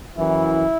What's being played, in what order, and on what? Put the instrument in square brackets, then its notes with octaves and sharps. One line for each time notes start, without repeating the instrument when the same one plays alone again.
[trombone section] F#2 E3 E4